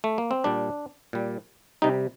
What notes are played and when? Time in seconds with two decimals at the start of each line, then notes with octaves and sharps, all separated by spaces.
0.04 A3
0.18 A#3
0.31 C4
0.44 A#2 G3 D4
1.13 A#2 G3
1.82 C3 G3 D#4